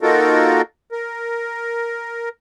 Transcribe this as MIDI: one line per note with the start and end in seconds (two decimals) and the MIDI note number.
0.01 0.62 58
0.01 0.62 63
0.01 0.62 65
0.01 0.62 66
0.01 0.62 69
0.01 0.62 70
0.92 2.29 70